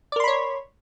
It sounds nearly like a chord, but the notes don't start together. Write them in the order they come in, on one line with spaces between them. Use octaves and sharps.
D5 A#4 C6 B5 C#5